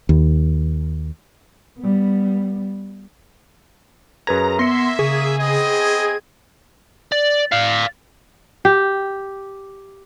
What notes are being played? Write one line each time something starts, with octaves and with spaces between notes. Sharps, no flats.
D#2
G3 B3
F#2 G#4 B4 A#5 G#6
A#3 B3 E5 C6 A#6 C#7
C#3 G#4 C#6
B3 C4 D#5
G#6
D5
D5 F5
G4